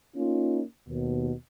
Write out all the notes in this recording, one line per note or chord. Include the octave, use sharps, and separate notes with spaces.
A#3 C#4 D#4 F4
D#2 B2